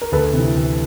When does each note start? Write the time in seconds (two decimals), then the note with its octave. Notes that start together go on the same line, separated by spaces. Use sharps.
0.02 A#4
0.12 D2 A4 B4
0.33 C3 E3
0.54 D2